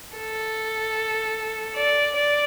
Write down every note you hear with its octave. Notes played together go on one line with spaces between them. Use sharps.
A4
D5
D5